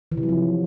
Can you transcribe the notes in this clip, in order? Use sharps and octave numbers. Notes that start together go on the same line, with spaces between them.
E3
C3
F#3
F3